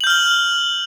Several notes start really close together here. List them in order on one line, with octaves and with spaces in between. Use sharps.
F#7 G6 F6 G7